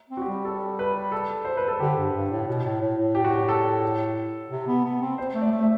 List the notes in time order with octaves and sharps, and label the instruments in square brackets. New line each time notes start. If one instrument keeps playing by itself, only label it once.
[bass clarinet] C4
[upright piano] F#4
G4
[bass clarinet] G3
[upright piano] A4
B4
A4
C5
B4
A4
[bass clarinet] D3 [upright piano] G4
[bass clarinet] G2
G2
A2
B2
A2
A2
A2
[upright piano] G4
F#4
G4
A4
[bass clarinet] C3
B3
B3
C4
[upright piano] C5
[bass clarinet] A3
[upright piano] D5
[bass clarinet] A3
[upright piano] E5